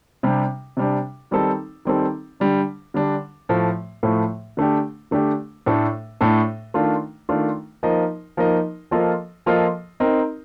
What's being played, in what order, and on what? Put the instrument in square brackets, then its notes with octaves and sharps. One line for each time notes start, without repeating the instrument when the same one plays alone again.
[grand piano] C3 G3 D4
C3 G3 D4
D#3 G3 C4 D#4 A4
D#3 G3 C4 D#4 A4
D3 G3 D4
D3 G3 D4
A2 F3 A3
A2 F3 A3
D3 A3 D4 G4
D3 A3 D4 G4
A2 A3 D4 A4
A2 A3 D4 A4
D#3 A3 D4 F4
D#3 A3 D4 F4
F3 A#3 D#4 A#4 D#5
F3 A#3 D#4 A#4 D#5
F3 A#3 F4 A4 D#5
F3 A#3 F4 A4 D#5
C4 D#4 A#4 D#5